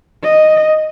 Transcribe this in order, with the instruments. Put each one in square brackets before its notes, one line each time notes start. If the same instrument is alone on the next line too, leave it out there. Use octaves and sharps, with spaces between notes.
[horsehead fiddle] D#5